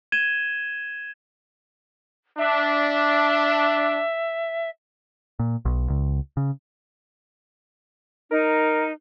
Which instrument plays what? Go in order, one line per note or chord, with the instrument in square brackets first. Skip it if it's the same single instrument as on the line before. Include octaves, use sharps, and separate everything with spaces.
[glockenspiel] G#6 D#7 E7 G7
[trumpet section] D4 [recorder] E5
[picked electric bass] A#2
B1
C#2
C#3
[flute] D#4 [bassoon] A#4